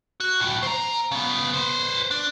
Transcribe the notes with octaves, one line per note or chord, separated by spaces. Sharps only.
F#4
C#2 A2
C5 A#5
C#3 B3
B4 C5
D4